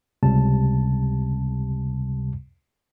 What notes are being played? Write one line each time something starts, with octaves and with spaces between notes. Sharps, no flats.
C#2 C3 G3 A5